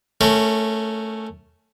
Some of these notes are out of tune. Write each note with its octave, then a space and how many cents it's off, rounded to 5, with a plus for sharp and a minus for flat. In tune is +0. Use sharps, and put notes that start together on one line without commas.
A3 +0 C#4 +0 A#4 -25